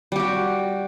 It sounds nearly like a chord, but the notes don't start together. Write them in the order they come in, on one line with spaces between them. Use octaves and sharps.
G3 G4 F#4